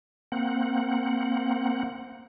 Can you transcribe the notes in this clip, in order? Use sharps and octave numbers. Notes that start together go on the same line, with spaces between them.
A#3 C4 F#5